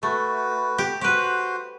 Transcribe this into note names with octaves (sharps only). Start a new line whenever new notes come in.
A3 F#4 B4
G4
F#4 G4 B4 C5